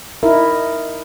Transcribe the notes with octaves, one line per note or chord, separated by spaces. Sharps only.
D#4 E4 A#4